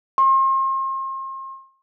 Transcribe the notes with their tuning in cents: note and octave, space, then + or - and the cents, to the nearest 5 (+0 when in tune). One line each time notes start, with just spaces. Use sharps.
C6 +40